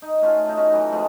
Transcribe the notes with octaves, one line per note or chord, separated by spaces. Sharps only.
D#4
A3 C#4 F4 F#4
A3 D#4
C#4 F#4
E3 F#3 A3
F3 G#3 A3